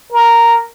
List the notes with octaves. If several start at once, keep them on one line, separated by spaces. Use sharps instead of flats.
A#4